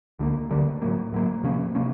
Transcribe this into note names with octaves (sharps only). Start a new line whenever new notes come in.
D2 D3 G3 A#3
D2 D3 G3 A#3
A2 F#3 A#3
A2 F#3 A#3
C3 F3 A#3 C#4
C3 F3 A#3 C#4